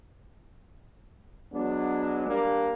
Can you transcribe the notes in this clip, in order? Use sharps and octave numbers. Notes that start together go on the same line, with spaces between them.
F#3 G#3 B3 D4
G3 A#3 D4